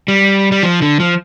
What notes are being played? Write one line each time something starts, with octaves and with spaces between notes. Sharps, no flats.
G3
G3
F3
D3
F3